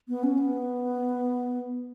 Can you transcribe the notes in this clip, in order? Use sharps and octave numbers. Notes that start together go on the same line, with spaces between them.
B3
C#4
B3